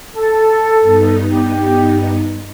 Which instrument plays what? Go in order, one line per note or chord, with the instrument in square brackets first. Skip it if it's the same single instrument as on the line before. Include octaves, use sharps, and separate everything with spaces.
[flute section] A4
[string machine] G2 B3 D#4
[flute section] G4